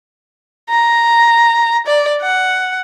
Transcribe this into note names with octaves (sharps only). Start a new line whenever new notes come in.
A#5
D5
F#5